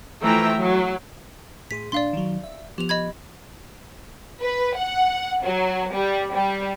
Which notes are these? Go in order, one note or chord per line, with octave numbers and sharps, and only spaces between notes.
E3 F3 A3 E5 G5 A#5
F#3
A2 G#4 C6 B6
A#2 D4 D5 F5 C6
D#3 F#3
E5
F3 B3 G4 F7
D#5 B5 G#6
B4
F#5
F#3
G3
G3